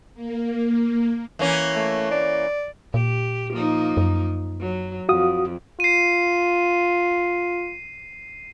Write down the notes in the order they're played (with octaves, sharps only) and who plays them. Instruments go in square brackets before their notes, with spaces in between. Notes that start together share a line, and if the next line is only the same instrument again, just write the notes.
[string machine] A#3
[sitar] E3 A#3 C#4
[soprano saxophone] A3
D5
[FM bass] A#2 [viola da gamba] G4
[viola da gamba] F3 A#3 D#4
[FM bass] F#2
[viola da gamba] F#3
[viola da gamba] F2 [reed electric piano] F#4 F5 D#6
[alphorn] F4 [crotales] C7 D#7